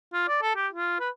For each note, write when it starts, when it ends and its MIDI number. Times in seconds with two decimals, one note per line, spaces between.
0.13 0.23 65
0.28 0.42 74
0.42 0.54 69
0.55 0.67 67
0.73 1.00 65
1.00 1.09 71